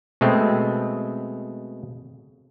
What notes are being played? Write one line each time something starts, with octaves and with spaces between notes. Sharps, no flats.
B2 G#3 A3 C4